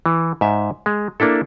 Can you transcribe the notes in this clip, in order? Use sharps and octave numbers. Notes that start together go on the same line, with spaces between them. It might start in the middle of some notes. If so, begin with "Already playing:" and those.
E3
G#2 E5
G#3
A#3 D4 E4 A4